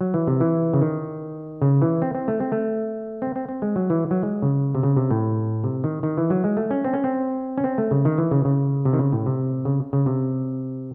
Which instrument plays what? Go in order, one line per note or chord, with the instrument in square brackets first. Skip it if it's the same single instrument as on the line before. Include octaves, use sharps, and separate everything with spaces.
[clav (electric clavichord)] F#3
E3
C3
E3
C#3
D#3
C#3
E3
C4
C4
A3
C4
A3
C4
C4
C4
G#3
F#3
E3
F#3
G#3
C#3
C3
C#3
C3
A2
C3
D#3
D#3
E3
F#3
G#3
A3
C#4
C4
C#4
C4
C#4
C4
A3
C#3
D#3
E3
C#3
C#3
C3
D#3
C#3
A2
C3
C#3
C#3
C3